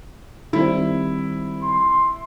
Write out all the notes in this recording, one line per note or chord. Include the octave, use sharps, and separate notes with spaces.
D#3 G3 C4 E4
C6